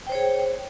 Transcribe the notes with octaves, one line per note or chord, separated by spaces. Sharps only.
G#4 C5 C#5 G5